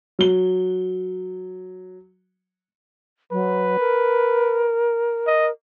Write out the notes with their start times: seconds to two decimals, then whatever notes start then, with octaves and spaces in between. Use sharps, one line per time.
0.19 F#3 G7
3.32 F#3 B4
3.79 A#4
5.27 D#5